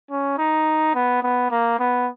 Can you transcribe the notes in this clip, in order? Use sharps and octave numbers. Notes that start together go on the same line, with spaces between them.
C#4
D#4
B3
B3
A#3
B3